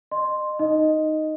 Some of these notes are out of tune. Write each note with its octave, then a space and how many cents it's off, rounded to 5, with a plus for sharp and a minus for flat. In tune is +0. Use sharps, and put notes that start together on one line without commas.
D#5 -30 C6 +0
D#4 +0 D#5 +0